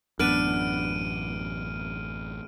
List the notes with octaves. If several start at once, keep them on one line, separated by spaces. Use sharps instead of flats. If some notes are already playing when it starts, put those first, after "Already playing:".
A1 F#2 B3 D4 B4 F6 D7 D#7